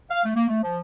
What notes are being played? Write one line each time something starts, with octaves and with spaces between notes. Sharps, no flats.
F5
A3
A#3
A3
F3